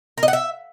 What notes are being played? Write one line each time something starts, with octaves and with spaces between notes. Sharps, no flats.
A#4
D#5
F#5
E5